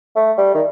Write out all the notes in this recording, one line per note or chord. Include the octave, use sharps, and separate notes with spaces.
A3
G3
D#3